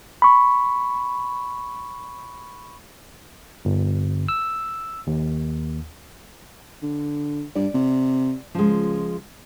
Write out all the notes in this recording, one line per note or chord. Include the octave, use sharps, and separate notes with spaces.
B5 C#6
G1
E6
D#2
D3
G2 D5
C3
C#2 F3 G#3